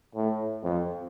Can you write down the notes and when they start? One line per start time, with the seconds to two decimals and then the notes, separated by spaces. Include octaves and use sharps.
0.15 A2
0.63 F2